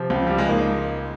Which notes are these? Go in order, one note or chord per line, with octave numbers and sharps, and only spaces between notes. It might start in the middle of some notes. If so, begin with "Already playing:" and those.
Already playing: C3 F3
C#2
G3
G#3
A#3 D#4